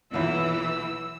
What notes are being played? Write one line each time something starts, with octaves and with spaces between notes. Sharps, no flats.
B1 E2 A#2 E3 E6